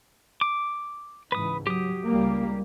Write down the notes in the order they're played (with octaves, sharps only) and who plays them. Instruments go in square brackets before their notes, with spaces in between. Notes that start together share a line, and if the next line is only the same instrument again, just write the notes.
[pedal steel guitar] D6
[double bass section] C#2 G#2 E3 [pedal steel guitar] B4 D#6
[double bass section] F#3 [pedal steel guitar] G4 D#6
[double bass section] C#2 G3 A#3